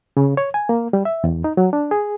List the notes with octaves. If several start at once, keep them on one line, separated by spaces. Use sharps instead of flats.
C#3
C#5
G#5
A#3
G3
E5
E2
D#4
F#3
D4
G#4